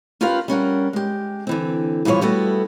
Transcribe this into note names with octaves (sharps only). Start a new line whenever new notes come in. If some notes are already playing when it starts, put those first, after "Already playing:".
C#4 F4 G4 A#4 B4 F5
G3 C#4 A#4 F#5
G#3 G4
D3 E3 C4
G2 B2 E3 F3 C#5
G3 A3 B3 E4 F#4 A4